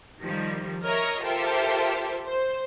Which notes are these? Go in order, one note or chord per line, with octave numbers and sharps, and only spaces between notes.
D#3 F3 G3
A#4 C#5 D#5 E5 A#5 C#6
F4 G4 A4 A#4 C5 E5
C5